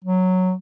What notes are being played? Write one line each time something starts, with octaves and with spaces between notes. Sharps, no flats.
F#3